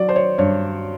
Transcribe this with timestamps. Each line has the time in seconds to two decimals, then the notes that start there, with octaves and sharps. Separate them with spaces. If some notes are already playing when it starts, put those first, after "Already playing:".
Already playing: F#3 D5
0.09 C5
0.16 C#5
0.38 G2 C#5